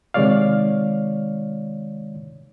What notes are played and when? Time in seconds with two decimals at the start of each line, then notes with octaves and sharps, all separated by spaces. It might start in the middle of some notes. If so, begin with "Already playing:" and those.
0.14 C3 D#3 G#3 C#5 D5 F5